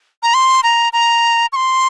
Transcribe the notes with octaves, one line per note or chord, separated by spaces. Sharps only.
A#5
C6
A#5
A#5
C#6
C6